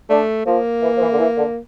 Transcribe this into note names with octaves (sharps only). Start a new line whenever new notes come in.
A3 D4
F3 A#3
E3
F3
E3
D3
E3
D3